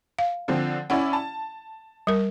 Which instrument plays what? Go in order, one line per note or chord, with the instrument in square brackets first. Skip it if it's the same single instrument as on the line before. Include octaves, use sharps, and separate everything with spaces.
[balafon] F5
[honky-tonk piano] D3 F3 C4
[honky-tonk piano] C#4 E4 D5 [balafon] F#5
[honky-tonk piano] A5
[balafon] G3 A#4